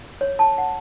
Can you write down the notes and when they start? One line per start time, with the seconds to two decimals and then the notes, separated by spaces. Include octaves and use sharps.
0.21 C#5
0.39 A5
0.58 F#5